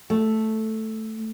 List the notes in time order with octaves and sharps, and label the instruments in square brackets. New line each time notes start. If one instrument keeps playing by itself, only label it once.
[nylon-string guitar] A3